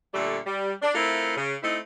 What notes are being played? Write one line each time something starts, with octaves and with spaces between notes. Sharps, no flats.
A#2 D3 G3 A3
G3
D4
A3 C4 E4 F4 A#4
C#3
A3 C4 D#4 E4